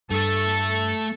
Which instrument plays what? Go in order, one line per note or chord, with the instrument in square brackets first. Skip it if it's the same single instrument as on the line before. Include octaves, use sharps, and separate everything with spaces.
[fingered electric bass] G2 [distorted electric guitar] A3 [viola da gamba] A4